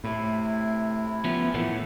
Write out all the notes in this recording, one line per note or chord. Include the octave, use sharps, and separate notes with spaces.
A2 C3 E4
F3 B3 C#4
A2 E3 F#3 F#5